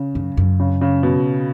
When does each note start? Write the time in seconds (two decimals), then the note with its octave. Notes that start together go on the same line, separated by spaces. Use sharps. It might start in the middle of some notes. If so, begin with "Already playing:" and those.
Already playing: C#3
0.15 F#2
0.37 F#2
0.60 C#3
0.81 C#3
1.03 B2